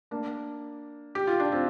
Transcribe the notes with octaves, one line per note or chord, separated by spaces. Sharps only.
A#3 D4
G4
F4
D4
C4 F4